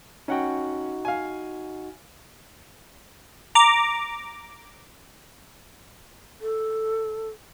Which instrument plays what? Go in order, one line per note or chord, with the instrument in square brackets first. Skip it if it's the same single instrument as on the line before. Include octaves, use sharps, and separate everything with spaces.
[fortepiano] C#4 F#5 G5 [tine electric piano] D#4 F#4
[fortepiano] F5 G#5
[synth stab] A#5 D6
[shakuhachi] A4